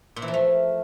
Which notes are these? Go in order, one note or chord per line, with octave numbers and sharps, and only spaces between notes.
A#2
E3
F3
A3